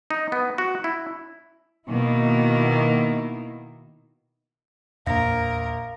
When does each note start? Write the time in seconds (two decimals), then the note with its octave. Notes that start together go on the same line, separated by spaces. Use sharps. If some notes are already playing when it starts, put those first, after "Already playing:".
0.11 D#4
0.32 B3
0.58 F#4
0.84 E4
1.88 B2 D#3 A#3 E4
5.07 A#1 E2 A#4 F5 A#6